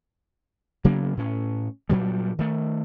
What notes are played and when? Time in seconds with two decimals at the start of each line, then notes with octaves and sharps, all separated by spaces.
0.84 C#3 F#3 A#3 B3
1.17 A2 C#4
1.90 G2 A#2 F#3 G3
2.39 D#3 A3